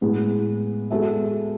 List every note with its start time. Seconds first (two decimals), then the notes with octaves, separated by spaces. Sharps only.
0.01 A2 G#3 B3 E4
0.91 G#3 B3 F#4 A4 E5